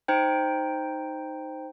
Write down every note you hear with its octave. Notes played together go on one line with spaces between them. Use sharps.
D#4 C5 G5